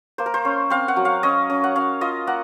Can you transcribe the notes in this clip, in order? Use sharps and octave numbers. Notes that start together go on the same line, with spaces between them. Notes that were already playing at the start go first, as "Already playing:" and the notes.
A#3 C5
A#4
C5
C#4
C4 F5
F#5
F#3
F5
C#4 D#5
C#4
F#5
C#4 F5
F4 D#5
A#3 F#5